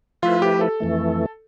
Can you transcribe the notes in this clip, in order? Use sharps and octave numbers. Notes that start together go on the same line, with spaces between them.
F3 A3 E4 F4 B4
G4
A4
F2 E3 A3